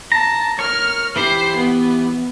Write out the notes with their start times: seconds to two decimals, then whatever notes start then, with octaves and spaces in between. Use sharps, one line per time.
0.12 A5 A#5
0.59 A#4 C#5 F6
1.16 E3 E4 G4 C5 C7
1.57 B3